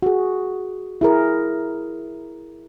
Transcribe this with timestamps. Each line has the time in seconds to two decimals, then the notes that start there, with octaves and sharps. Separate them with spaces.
0.03 F#4 G#4
1.01 E4 G#4 A#4